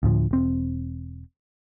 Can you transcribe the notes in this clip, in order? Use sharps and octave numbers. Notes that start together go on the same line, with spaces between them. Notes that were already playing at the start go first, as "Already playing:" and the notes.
D2 A2 F3
E1 C4